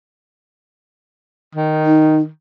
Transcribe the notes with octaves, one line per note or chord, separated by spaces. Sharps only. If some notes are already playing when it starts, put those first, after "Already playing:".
D#3
D#4